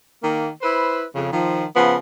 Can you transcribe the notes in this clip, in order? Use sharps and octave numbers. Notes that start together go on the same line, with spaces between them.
D#3 A#3
E4 B4 C5
F2 C#3
D#3 F3
C#3 F3 B3